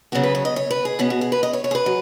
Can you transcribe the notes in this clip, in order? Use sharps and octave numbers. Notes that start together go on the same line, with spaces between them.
C#3 F#3 B3 F#4
B4
C#5
D#5
C#5
B4
G#4
B2 B3 C#4
F#4
G#4
B4
D#5
C#5
C#5
G#4
B4
F#3